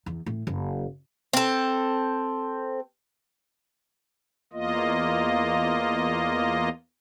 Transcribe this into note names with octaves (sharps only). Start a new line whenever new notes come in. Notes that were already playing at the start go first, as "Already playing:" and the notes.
E2
A2
F#1
C4 A4
E2 A#3 F4 D#5